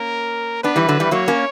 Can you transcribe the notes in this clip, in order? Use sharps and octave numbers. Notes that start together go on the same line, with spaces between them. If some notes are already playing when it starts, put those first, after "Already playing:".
Already playing: A#3 C#4 A#4
B3 D4 B4
E3 G3
D3 F#3
E3 G3
F#3 A#3 C#5
A#3 C#4